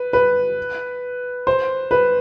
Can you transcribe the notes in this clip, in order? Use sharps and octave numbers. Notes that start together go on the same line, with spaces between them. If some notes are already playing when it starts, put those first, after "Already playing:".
Already playing: B4
B4
C5
B4